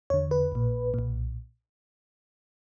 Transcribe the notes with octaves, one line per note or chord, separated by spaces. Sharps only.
E2 D3 C#5
B4
A#1 A#2
B1 A#2